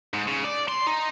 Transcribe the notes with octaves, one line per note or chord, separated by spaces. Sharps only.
G#2
C#3
D5
C6
D#4